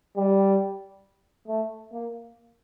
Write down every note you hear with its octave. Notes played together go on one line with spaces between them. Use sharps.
G3
A3
A#3